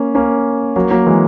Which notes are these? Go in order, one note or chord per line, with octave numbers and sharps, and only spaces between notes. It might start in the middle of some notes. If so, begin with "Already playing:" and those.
Already playing: A#3 C#4
A#3 C#4
F#3 A#3
F#3 A#3
E3 G#3